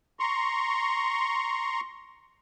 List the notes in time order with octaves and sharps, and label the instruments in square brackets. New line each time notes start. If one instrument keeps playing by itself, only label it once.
[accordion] A#5 C6 C#6